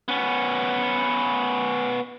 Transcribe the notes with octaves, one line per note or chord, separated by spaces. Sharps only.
B3 C#4